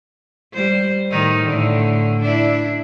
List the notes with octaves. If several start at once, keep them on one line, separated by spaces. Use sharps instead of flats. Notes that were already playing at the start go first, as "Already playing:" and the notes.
G3 C5
A2 D#3 D#4
A2 D3
D4 E4